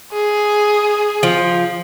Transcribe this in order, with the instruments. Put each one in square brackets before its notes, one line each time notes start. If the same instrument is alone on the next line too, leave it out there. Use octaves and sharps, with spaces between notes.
[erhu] G#4
[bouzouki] F3